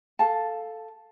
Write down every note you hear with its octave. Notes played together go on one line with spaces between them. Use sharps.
A4 F5 A5